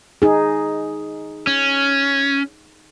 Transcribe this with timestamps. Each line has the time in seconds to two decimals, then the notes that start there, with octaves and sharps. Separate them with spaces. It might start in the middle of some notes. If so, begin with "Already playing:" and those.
0.22 D#4 G#4
1.47 C#4